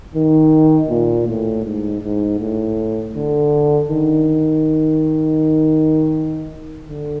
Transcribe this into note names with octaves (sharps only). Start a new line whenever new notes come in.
D#3
A#2
A2
G#2
G#2
A2
D3
D#3
D3